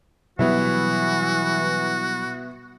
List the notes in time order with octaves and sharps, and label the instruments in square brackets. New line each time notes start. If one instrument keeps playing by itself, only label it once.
[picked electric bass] B2 F#3 G3 [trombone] E3 [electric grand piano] B3 E4 E5 [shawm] F#4